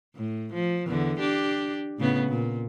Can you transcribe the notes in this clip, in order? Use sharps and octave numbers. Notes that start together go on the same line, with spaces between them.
A2
F3
E2 D3
D4 G4
A2 C#3 B3
A#2